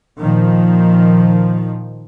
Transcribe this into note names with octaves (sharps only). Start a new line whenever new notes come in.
A#2 D#3 F3